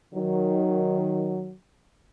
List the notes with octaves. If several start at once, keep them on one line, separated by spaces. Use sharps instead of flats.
D#3 F#3